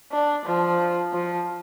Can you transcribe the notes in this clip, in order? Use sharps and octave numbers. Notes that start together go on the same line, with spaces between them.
D4
F3
F3